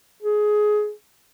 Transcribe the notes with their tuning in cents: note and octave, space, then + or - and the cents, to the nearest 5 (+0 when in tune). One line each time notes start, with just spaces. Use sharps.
G#4 +15